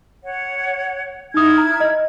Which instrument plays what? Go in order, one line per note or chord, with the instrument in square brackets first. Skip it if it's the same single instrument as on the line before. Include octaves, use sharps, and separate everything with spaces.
[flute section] C#5 F#5
[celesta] D#4 D#6 [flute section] E4 F6 G#6
[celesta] A#5
D#5